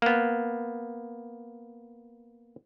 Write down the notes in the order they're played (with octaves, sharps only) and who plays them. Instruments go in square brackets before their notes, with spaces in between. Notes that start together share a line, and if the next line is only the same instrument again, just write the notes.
[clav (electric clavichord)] A#3 B3